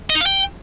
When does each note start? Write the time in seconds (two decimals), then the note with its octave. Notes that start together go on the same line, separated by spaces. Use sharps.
0.10 D#5
0.15 D#4
0.21 F5
0.26 G5